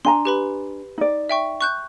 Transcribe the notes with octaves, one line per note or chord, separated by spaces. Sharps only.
D4 G#5 A#5 C6
G4 B4 B5
D#4 D5
E5 G5 C#6
C#6 F#6 G6